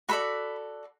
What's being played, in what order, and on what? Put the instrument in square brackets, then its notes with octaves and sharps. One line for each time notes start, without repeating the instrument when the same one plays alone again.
[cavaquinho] F#4 A4 D5 B5